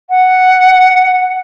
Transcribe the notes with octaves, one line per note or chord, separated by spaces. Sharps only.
F#5